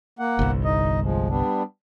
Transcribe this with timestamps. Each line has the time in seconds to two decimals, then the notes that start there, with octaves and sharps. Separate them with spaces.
0.19 A#3 F#5
0.39 G1 C2
0.65 D#4 D#5
1.02 F3 G#3
1.29 G3 B3 D4